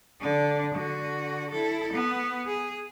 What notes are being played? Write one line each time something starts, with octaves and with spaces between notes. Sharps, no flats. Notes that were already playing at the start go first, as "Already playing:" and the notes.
D3 D4
D3 F#4
E4 A4
B3
G#4